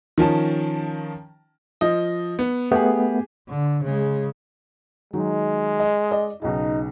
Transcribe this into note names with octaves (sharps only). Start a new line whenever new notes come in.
D#3 F3 C#4 A5
F3 D#5
B3
A3 B3 G4 G#4
D3
C#3 G#3
D#3 F#3 G#3
D#5
D5 D#5
B1 C#3 D#4